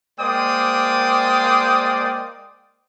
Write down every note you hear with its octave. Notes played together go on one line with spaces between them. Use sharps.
G#3 A#3 C5 D5 G5 D#6